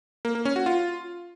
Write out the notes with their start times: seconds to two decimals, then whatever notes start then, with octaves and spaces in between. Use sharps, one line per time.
0.25 A#3
0.35 A#3
0.45 C#4
0.56 F#4
0.66 F4